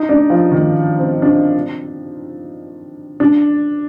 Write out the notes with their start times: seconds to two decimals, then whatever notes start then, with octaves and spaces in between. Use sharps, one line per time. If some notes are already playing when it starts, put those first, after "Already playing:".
Already playing: D#4 D#5
0.09 D4 D5
0.30 F3 F4
0.52 D#3 D#4
0.99 C4
1.22 D4
1.27 C4
3.20 D4